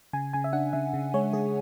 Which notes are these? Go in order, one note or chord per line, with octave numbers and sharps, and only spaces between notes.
C#3 G#5
C#3 G#5
E5
D4 F#5
C#3 E5
C#3
G#3 C#5
C#3 G#4